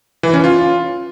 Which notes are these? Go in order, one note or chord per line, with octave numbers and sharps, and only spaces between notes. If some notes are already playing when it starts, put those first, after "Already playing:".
E3
C#4
F4